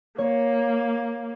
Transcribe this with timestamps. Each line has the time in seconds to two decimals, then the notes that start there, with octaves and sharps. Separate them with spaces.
0.18 A#3 C#5